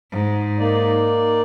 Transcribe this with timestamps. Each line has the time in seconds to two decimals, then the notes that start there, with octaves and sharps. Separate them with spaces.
0.12 G#2
0.59 A#3 D#4 D5